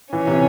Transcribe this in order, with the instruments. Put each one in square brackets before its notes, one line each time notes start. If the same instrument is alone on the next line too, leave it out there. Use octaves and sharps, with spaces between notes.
[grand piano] E3 [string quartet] C#4
[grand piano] C3